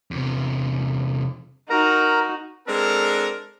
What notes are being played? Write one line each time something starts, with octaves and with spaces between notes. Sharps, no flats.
E2 C3
D#4 F#4 A#4 A#5
G#3 C4 D4 A4 A#4